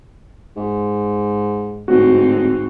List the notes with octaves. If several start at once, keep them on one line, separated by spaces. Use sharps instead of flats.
G#2
D1 G#2 C4 D#4 F#4